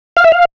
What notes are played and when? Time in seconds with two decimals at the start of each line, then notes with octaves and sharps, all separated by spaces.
0.17 F5
0.24 E5
0.32 F5